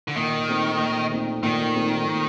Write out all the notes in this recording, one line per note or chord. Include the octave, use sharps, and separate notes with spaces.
D3
A#2 D#3
A3 C4 D#4
A#2
A3 C4 D#4
A#2 D#3
A3 C4 D#4
A#2